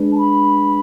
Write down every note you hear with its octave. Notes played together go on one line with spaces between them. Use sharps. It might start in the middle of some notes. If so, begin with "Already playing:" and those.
Already playing: G#3 D4 G#4 B4
A5
B5